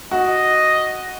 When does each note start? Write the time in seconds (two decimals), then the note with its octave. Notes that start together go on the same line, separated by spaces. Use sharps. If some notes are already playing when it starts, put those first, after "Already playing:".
0.11 F#4 D#5